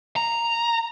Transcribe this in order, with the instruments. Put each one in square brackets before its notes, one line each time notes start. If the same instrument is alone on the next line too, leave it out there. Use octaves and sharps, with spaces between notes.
[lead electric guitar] A#5